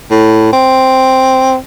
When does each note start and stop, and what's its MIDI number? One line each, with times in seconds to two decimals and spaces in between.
0.11 0.49 45
0.53 1.57 60